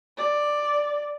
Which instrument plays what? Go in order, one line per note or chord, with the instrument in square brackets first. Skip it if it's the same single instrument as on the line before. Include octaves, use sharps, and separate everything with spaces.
[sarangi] D5